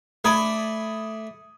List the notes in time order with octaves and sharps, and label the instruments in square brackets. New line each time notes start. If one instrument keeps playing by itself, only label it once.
[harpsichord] A3 D5 [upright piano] B5 D#6 G#6